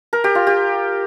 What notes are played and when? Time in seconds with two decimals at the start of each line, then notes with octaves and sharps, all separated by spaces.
0.13 A#4
0.24 G4
0.35 F4
0.47 G4